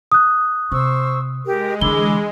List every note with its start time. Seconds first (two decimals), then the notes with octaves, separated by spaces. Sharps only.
0.12 D#6 F#6
0.72 C3 C5 C#6 E6
1.46 G#3 G4 A#4
1.81 D3 E3 B5 D6 E6 G7